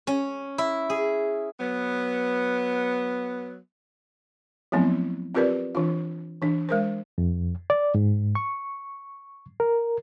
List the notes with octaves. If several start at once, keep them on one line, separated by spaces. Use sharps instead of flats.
C#4
E4
G#4
F#3 B3
F3 F#3 A3 B3 C4 E4
C4 F4 G4 A#4 B4 D5
E3 D4 F4
E3 D4
G#3 A#4 C5
F2
D5
G#2
C#6
A#4